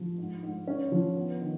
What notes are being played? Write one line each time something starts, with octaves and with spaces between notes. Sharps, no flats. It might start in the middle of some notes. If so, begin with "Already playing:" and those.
Already playing: F3
G#2
G#2
C#4
F3
B3
D#3